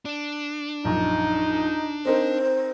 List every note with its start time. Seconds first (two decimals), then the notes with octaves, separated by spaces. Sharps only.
0.05 D4
0.85 A#1 F#2 D#4
2.06 C4 D#4 A#4 C5